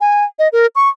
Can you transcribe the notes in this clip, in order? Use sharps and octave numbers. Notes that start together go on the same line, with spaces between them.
G#5
D#5
A#4
C#6